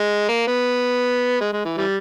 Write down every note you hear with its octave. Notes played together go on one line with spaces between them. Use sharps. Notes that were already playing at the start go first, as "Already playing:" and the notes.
Already playing: G#3
A#3
B3
G#3
G#3
E3
E3 G3